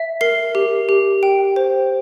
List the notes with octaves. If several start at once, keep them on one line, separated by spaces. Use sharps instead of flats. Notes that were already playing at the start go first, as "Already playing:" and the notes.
Already playing: E5
A#4 C7
G4
G4
G5
C5